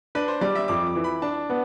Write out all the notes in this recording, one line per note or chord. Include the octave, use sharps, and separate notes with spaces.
D4 B4
C5
G3 D5
E5
F2 D6
D6
E3
B5
D4 A5
B3